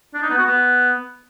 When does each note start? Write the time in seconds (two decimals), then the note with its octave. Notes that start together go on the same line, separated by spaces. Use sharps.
0.14 D4
0.22 D#4
0.30 B3
0.38 F#4
0.46 B3